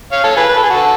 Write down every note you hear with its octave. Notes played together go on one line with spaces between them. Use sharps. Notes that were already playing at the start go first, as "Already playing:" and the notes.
C#5 F5
A4 C#5
G#4 B4
B4
A4
G#4
F#4 A4